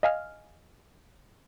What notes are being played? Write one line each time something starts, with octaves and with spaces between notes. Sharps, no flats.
D#5 F5 G#5 F6